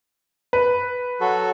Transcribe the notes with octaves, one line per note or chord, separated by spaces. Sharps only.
B4
F#3 F#4 A4